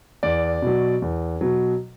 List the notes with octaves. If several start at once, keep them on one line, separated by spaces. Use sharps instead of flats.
E2 D5
B2 F#3
E2
B2 F#3